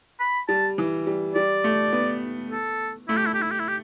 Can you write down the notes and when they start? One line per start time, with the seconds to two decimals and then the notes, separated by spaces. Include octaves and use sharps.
0.20 B5
0.48 G3 A5
0.78 E3
1.07 G3
1.35 G3 D5
1.64 A3
1.93 B3
2.51 A4
3.08 A3 E4
3.17 G4
3.26 E4
3.34 G4
3.42 E4
3.51 G4
3.59 E4
3.68 G4